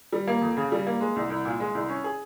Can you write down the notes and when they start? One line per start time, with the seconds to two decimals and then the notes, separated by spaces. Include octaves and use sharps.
0.13 G3
0.27 A#3
0.41 F2
0.57 C#3
0.72 G3
0.87 A#3
1.00 G#3
1.16 C2
1.30 C2
1.45 A#2
1.60 G#3
1.75 C2
1.89 C#4
2.04 G#4